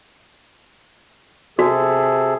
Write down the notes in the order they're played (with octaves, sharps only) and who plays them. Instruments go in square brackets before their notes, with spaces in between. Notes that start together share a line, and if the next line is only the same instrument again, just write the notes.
[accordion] C3 G#4 A4 [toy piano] F#4